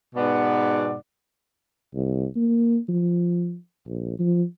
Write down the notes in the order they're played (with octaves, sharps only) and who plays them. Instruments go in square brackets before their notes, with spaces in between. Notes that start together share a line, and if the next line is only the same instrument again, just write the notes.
[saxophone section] G#2 B2 B3 D5 F#5
[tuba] C2
A#3
F3
A#1
F3